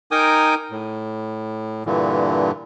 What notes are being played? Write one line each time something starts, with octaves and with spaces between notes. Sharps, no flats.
D#4 A#4 G5 G#5 D6 D#6
A2
G2 A#2 D3 E3